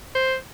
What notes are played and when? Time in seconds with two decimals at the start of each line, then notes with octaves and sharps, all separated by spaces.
0.15 C5